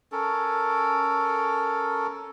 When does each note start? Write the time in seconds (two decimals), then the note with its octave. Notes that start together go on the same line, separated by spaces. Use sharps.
0.12 C#4 A4 A#4